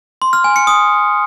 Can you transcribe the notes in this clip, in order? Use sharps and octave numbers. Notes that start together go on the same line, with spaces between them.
C6
F6
G#5
C#7
D#6